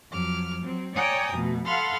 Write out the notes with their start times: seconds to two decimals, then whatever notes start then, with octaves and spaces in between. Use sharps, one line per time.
0.11 F2 F#3 D6 F6
0.63 F#3 C4
0.95 C#5 D5 G5 G#5 A#5 D#6
1.32 F2 B2 A3
1.65 A4 F5 F#5 B5 C6 F6